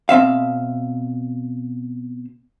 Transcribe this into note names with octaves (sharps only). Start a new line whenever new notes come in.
B2 C4 E5 F5